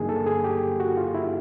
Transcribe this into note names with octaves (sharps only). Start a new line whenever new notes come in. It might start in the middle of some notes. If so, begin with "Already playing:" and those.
Already playing: G2 D3 F#3 A#3 D#4 G#4
A4
G#4
G4
F#4
F4
E4